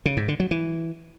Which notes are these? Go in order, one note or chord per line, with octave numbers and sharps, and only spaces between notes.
C#3
G#2
D3
F#3
E3